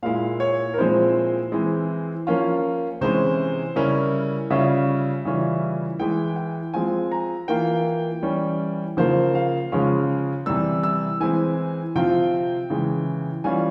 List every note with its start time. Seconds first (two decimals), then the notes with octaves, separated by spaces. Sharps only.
0.03 A#2 G#3 E4 F5
0.40 C#5
0.74 A#4
0.78 A#2 F3 G#3 C4 E4 C5
1.52 E3 G#3 C4 E4
2.27 F3 A#3 C#4 F4
3.01 C3 E3 G#3 C#4 E4 C5
3.76 C#3 G3 C#4 E4 A#4
4.50 C#3 G3 C#4 F4 E5
5.25 C#3 E3 G3 C#4 F4
5.99 E3 G#3 E4 G5
6.36 G5
6.74 F3 G#3 C4 F4 G#5
7.11 A#5
7.48 E3 A#3 F4 G5
8.23 E3 G3 C#4
8.97 C#3 F3 A#3 F4 C5
9.35 F5
9.72 C#3 F3 G#3 C#4 F4
10.46 C3 E3 G3 E6
10.83 E6
11.20 E3 G#3 C4 E4 G#5
11.95 C3 F3 C4 F4 G5
12.70 C#3 E3 G#3
13.44 E3 G3 C#4 F4 G#5